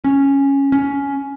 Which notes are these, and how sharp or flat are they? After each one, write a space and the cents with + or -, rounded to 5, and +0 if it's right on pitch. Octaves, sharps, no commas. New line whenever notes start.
C#4 -5
C#4 +15